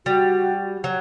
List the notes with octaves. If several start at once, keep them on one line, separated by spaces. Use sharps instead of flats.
G3 F#4
F#3